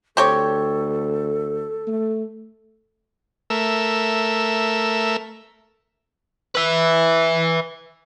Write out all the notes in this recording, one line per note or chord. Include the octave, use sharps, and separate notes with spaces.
D2 C4 G4 A4 C#5
A3
A3 A#4 E5
B4 E5